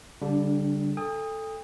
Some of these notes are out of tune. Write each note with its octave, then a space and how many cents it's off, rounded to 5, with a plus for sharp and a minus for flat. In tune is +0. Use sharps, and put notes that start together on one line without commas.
D3 -35 G3 +0 D4 +0
A4 +0 G5 +45 D#6 +0